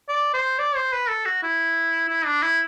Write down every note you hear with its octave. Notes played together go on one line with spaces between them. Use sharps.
D5
C5
D5
C5
B4
A4
F#4
E4
E4
D4
E4